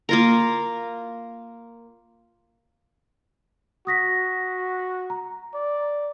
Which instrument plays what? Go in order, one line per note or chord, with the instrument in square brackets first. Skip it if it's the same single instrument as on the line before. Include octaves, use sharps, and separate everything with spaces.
[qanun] A#3 F4 A#4
[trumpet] F#4 [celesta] D#6 A#6 B6
[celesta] A#5
[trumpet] D5